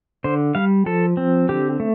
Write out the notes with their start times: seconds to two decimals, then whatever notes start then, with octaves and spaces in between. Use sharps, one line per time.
0.24 D3 C5
0.55 G3 F5
0.86 F3 A4
1.17 C4
1.49 D3 G4
1.80 A3